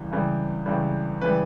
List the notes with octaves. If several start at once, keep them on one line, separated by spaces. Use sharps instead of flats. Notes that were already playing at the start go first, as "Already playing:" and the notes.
Already playing: C#2 C#3 E3 G3
C#2 C#3 E3 G3
C#2 C#3 E3 G3
C#3 E3 G3 B4